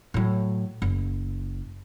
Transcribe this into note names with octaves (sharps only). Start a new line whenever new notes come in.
A2 F#3
F#1